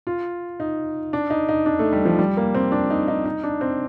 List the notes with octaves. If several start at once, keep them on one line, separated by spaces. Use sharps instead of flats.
F4
D#4
D4
D#4
D#4
D4
A3
G3
F3
G3
A#3
C4
D4
D#4
D#4
D#4
D4
C4